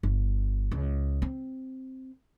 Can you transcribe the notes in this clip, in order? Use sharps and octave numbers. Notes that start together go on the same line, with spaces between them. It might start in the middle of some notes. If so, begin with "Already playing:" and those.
G1
C#2
C4